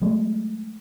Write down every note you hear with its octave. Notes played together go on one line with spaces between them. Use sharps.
F#3 G#3 A3